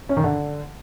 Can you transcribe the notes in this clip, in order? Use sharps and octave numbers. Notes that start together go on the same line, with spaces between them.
C#4
D#3
D3